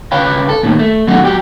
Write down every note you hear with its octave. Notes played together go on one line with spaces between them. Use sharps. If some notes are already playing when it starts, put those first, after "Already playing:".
C#3 B4 C#5 F5 G5 B5
A4
D#2 A2 D#3
A3
B2 D#3 F#3 G#3 A3 F#4
F#3 G4